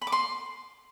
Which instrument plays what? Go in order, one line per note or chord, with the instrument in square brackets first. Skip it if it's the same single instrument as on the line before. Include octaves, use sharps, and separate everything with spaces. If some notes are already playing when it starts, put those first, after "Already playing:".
[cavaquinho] B5
D6
C6